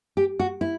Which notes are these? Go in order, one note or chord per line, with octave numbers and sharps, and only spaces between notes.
G4
F#4
E4